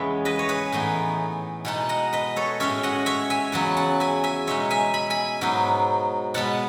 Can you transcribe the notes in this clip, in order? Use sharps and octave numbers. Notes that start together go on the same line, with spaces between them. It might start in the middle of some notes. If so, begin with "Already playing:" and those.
Already playing: E2 C#3 E3 G#3 B3 C#5 E5
B4 D#5
C#5
G#4 B4
A2 E3 B3 D#4
B2 G#3 D#4 F#5 A5
D#5 F#5
B4 D#5
A4 C#5
A2 G#3 C#4 C#5 E5
D#5 F#5
C#5 E5
E5 G#5
E2 C#3 F#3 B3 F#5 A5
F#5 A5
E5 G#5
E5 G#5
B2 G#3 D#4 C#5 E5
E5 G#5
B5
G#5 B5
G#2 F#3 B3 D#4
B2 G#3 B3 F#5 A5